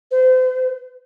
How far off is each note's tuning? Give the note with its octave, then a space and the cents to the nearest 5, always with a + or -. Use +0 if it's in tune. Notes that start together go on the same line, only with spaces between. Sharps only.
C5 -35